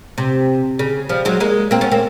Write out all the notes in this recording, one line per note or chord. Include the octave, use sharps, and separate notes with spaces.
C3
C#3
F3 G3
F#3 G#3
G#3 A#3
A#3 C4
B3 C#4
A#3 C4